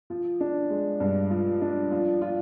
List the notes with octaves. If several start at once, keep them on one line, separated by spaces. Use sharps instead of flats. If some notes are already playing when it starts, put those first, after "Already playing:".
F3
D4
G#3
G2
F3
D4
F3
F4